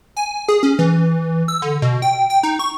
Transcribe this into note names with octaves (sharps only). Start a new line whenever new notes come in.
G#5
G#4
C#4
E3
E6
D3
B2
G5
G5
D#4
C#6